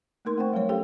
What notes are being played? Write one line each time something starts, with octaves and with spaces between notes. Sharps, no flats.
A3 A#3 D#4 A#4 C6
A3 C4 C5 F#5 G5 C#6
F#3 G3 A3 A#4 C#5
C#4 G4 A4 F5 G5